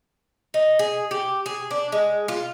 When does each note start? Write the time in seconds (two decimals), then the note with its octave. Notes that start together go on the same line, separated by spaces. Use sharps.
0.54 D#4
0.79 G#4
1.11 G4
1.46 G#4
1.71 D4
1.92 G#3
2.28 F4